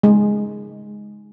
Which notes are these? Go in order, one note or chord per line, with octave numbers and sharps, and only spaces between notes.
G#3